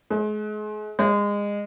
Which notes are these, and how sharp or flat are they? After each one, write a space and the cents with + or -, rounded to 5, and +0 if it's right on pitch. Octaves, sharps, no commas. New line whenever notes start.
G#3 +35
G#3 -25